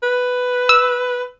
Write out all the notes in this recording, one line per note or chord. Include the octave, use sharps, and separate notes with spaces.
B4
E6